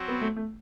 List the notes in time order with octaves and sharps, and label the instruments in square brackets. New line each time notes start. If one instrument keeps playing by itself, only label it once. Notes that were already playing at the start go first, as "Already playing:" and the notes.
Already playing: [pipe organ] F#3 C4 F#4
[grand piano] B3
A3
A3